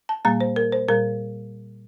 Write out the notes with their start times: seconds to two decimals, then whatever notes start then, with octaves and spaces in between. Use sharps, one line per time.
0.09 A5
0.25 A#2 G3 A#3 A#5
0.41 C5
0.56 A#4
0.72 C5
0.88 A#2 G3 A#4